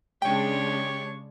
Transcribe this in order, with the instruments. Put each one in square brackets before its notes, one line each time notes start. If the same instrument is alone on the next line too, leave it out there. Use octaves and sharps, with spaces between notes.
[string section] C#3 G#3 D4 [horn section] G4 C#5 [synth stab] G5